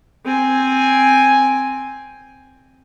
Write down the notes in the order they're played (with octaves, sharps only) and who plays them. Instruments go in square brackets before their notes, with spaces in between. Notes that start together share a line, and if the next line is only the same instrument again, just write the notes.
[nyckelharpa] C4 G#5